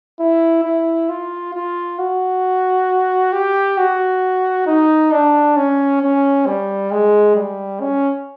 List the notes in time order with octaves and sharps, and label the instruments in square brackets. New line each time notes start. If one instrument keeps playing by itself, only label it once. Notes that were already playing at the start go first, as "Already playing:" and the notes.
[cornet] E4
E4
F4
F4
F#4
G4
F#4
D#4
D4
C#4
C#4
G3
G#3
G3
C#4